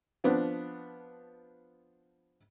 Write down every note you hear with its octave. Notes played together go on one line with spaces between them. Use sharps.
F3 B3 C4 D4